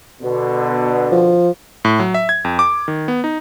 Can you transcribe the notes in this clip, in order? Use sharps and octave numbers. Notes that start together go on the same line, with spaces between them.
B2 D3
F3
A2
F#3
E5
G#6
F2
D6
D#3
B3
D#4